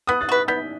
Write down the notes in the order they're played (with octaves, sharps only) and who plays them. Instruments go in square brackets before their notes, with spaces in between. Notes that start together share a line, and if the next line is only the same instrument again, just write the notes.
[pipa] B3 [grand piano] D#6 F#6
[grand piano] F#6 A6
[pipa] F#4 B4
[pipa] B3 [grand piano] G6 B6